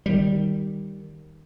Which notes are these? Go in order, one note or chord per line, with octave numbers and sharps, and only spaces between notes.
D#3 G3